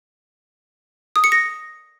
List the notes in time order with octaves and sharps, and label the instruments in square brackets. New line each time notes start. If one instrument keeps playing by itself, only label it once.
[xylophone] D#6
C#7
A#6